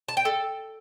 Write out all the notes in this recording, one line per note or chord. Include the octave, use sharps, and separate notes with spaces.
A5
G5
A4